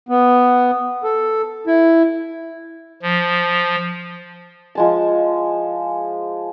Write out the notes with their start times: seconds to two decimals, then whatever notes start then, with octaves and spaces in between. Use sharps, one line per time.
0.09 B3
1.04 A4
1.67 E4
3.02 F3
4.75 F3 G#3 A5